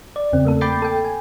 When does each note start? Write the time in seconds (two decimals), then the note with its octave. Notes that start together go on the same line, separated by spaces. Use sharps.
0.16 D5
0.33 E2 C#3 C4
0.45 A3 A#3 A4
0.61 G5 B5 D6 G6 A6 C7
0.82 A4 G5
1.05 G#5